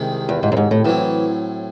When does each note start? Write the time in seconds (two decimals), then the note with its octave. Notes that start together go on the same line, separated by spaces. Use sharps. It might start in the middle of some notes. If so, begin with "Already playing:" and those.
Already playing: C2 C3 D#3 G#3
0.29 E2
0.43 G#2
0.52 F#2
0.57 G#2
0.71 A2
0.85 A2 E3 F#3 C4